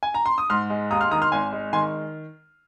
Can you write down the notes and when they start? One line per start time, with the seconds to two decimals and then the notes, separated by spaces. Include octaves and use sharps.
0.03 G#5
0.14 A#5
0.26 C6
0.38 D#6
0.50 G#2 C6 F6
0.70 G#3
0.91 D#2 A#5 D#6
1.01 C6 F6
1.11 D#3 A#5 D#6
1.22 C6 F6
1.32 G#1 G#5 C6
1.53 G#3
1.73 D#3 G#5 C6